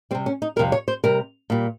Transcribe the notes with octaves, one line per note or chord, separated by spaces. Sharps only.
C3 G3 C4
C#4
D#4
F2 C3 G3 A#4
C#5
C5
C3 G3 A#4
A#2 G3